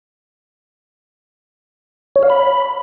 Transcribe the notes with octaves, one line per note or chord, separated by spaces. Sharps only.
C#5
F5
B5